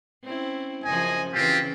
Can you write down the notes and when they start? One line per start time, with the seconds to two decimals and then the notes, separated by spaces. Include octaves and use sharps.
0.24 C4 C#4 E4
0.85 F#2 C#3 F3 D#5 G#5
1.34 C#3 E3 C4 F4 G4